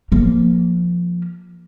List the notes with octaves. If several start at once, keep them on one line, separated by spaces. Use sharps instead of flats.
F3 A#3